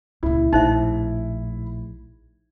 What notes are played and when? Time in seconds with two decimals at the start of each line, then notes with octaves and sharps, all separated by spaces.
0.23 C#2 A#2 E4
0.53 A#1 A2 D#4 C5 E5